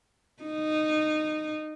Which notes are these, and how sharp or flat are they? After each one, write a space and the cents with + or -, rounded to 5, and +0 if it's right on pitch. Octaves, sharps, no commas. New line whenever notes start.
D#4 -15